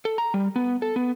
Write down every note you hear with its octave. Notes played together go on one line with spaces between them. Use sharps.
A4
A#5
G3
B3
A4
B3